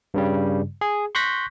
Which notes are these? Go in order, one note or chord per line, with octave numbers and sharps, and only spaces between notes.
G2 C#3 G3
G#4
C6 C#6 F#6 G6 A#6 B6